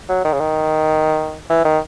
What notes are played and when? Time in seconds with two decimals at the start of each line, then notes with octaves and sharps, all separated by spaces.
0.09 F#3
0.24 D#3
0.33 C#3
0.40 D#3
1.50 E3
1.64 D#3